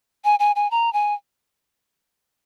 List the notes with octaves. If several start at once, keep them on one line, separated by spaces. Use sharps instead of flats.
G#5
G#5
G#5
A#5
G#5